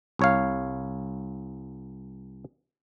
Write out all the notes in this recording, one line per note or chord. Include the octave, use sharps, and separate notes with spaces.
C2 C#5 F5